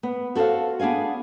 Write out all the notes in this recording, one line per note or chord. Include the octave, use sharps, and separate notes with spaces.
B3
F#4 A4 A#4 C5 F5
B3 D4 G#4 F5 G#5